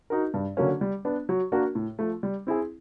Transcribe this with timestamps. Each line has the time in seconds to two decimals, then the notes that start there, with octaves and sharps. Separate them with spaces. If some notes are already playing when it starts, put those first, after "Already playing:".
0.10 D#4 F#4 A#4
0.34 G2
0.57 D3 F#3 A#3 C#4
0.81 G3
1.05 B3 D4
1.29 F#3
1.52 A#3 D4 F#4 A#4
1.75 A2
1.99 F3 A3
2.23 G3
2.47 C4 E4 G#4